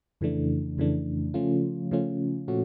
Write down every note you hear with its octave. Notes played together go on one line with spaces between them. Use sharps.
F2 C#3 E3 A3 D4
F2 C#3 E3 A3 D4
C#3 F3 A3 C#4 F4
C#3 F3 A3 C#4 F4
A#2 F3 A3 C#4 F#4